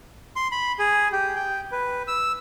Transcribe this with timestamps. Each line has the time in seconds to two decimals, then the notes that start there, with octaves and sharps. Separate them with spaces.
0.36 C6
0.52 B5
0.79 G#4
1.12 G4
1.35 G5
1.72 B4
2.08 E6